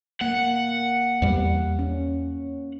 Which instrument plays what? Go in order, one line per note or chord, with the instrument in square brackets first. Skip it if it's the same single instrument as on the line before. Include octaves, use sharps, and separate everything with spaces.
[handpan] A#3 [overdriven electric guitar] F#5
[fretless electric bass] E2 G3
[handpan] C#4